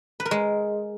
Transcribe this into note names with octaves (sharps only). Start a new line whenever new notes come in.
B4
A#4
G#3